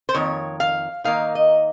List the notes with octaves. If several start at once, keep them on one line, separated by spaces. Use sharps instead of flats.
C5
F2 D#3 A#3 C#5
F5
D#3 A#3 D#4 F5
D#5